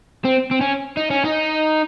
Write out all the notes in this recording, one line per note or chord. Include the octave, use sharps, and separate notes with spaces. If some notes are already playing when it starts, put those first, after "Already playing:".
C4
C4
C#4
D#4
C#4
D#4